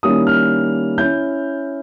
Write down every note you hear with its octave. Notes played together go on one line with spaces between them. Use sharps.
D#3 G3 A#3 C#4 E4 D#6
F6
C#4 E4 G6